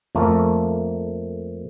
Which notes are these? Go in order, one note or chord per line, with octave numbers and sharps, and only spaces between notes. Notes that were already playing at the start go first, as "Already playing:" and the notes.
F2 A3 A#3